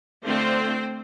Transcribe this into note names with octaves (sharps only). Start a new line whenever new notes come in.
D3 A3 C4 D4 F4 C5